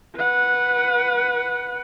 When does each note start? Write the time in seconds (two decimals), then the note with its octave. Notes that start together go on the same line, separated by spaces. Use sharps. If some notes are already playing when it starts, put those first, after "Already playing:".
0.16 B4 F#5